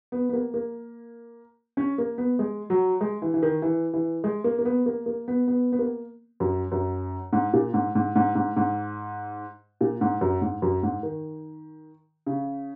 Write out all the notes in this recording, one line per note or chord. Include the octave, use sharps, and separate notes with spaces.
B3
B3
A#3
A#3
C#4
A#3
B3
G#3
F#3
G#3
E3
E3
D#3
E3
E3
G#3
A#3
A#3
B3
A#3
A#3
B3
B3
B3
A#3
F#2
F#2
G#2
A#2
G#2
G#2
G#2
G#2
G#2
A#2
G#2
F#2
G#2
F#2
G#2
D#3
C#3